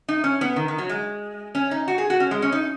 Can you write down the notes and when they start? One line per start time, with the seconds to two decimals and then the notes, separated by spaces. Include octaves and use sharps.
0.08 D#4
0.24 C#4
0.41 B3
0.56 D#3
0.68 D#3
0.78 F#3
0.89 G#3
1.55 C#4
1.71 D#4
1.88 F#4
1.98 G#4
2.10 F#4
2.20 C#4
2.31 G#3
2.42 C#4
2.52 D#4